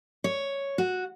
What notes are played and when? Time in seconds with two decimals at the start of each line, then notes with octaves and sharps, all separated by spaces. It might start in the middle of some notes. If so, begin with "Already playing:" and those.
0.24 C#5
0.78 F#4